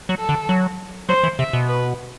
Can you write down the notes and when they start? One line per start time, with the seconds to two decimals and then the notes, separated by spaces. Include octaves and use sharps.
0.09 F#3
0.19 A4
0.29 D3
0.49 F#3
1.09 F#3 C5
1.23 E3
1.39 C3 E5
1.53 B2
1.69 B4